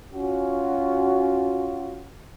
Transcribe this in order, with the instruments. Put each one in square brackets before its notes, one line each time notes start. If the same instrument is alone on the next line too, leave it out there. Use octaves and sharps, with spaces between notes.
[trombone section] C#4 F4 F#4